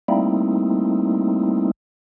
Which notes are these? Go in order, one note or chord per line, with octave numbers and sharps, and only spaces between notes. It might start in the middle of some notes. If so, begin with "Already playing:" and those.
G3 A3 A#3 C4 D#4 E4